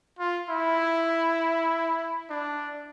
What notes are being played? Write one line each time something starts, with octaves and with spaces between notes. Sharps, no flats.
F4
E4
D4